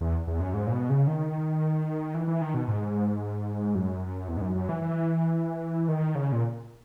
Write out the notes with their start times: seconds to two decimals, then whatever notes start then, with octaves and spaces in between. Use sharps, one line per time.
0.01 E2
0.27 E2
0.40 F#2
0.54 G#2
0.67 A#2
0.72 B2
0.90 C#3
1.07 D#3
2.14 E3
2.27 E3
2.41 D#3
2.54 B2
2.68 G#2
3.75 F#2
4.28 E2
4.37 G#2
4.41 F#2
4.55 F#2
4.69 E3
4.82 E3
5.88 D#3
6.15 C#3
6.32 A#2